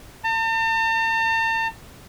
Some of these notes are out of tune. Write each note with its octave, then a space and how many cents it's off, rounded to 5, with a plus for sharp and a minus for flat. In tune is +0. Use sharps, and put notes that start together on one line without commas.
A5 +45